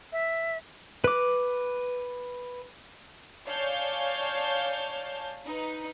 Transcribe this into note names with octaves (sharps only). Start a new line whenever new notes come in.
E5
B4 D6
C#5 D5 F5 G#5 A5 G6
D#4 B4